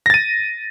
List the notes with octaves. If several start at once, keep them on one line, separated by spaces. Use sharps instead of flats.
A6 A#6 D#7